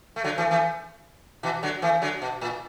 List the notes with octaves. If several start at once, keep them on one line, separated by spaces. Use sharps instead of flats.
A3
D3 F#3
E3 A3
E3 A3
B2 E3
D3 F#3
E3 A3
D3 F#3
B2
A2